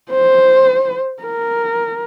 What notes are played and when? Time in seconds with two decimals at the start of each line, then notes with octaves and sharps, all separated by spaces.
0.11 C5
1.23 A#4